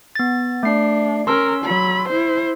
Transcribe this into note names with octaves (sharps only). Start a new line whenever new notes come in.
B3 A6
A3 D4 C7
C#4 A#4 C6 E6
F#3 B5
E4 C5